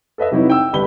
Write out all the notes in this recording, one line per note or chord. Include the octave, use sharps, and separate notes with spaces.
A4 B4 D#5 E5
C3 F#3 D#4 E4 B4
G5 E6
G1 G4 B4 B5 G7